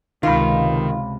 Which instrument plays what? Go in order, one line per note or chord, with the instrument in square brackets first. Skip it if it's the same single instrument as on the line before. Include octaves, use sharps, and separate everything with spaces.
[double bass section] C#2 C3 [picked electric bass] D#3 [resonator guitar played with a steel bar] F4 [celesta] F5 B5